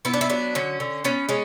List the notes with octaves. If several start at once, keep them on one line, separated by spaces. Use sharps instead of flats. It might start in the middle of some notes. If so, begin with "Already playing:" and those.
B3 E4
D4
E4
F#3 D4
D3 C#4
D3
B3 C#4
G#3 C#4